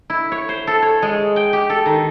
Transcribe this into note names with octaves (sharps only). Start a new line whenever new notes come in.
E4
C#5
C5
A4
C#5
G#3
G5
G4
A4
D#3